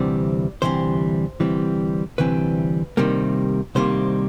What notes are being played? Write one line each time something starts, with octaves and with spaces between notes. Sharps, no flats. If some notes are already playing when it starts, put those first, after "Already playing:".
Already playing: D2 C3 E3 G3 C4 D5
D2 C3 E3 G3 C4 C5
D2 C3 E3 G3 C4
D2 C3 E3 G3 C4 B4
C2 C3 D#3 G3 A#3
C2 C3 D#3 G3 A#3 C5